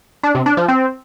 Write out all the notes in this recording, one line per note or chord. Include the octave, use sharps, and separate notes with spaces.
D4
C3
D4
F3
C4